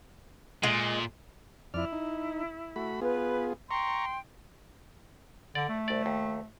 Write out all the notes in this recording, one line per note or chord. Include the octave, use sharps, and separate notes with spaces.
A#2 G#3
F2 E4 D5 F6
D#4
A3 F#4 B5
B3 F4 G#4 B4
G5 A#5 C6 C#6
D3 D5
A3
C2 D5
D#2